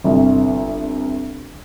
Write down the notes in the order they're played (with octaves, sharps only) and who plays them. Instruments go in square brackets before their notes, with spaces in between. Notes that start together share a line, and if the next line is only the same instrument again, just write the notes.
[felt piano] G1 C2